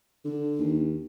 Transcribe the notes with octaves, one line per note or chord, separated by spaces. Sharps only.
D3 D4
D#2